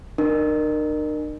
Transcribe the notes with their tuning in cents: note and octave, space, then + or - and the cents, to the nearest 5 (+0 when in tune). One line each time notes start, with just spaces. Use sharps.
D#4 -45 A#4 +0